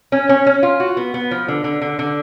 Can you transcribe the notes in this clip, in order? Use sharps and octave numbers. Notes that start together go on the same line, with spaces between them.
C#4
C#4
C#4
F4
F#4
B3
B3
F3
D3
D3
D3
D3